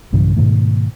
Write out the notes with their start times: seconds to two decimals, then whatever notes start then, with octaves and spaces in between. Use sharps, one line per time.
0.13 B1 G2 C#3 E3
0.36 G#2 B2 D#3 A3